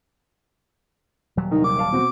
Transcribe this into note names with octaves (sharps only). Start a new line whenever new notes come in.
D#1 F#3 G3
C2 D#3 D#4
D6
F5 A5
B2 C4 F#4